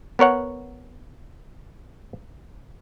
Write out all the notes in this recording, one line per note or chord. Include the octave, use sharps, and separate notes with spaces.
B3 A#4 C#5 F#5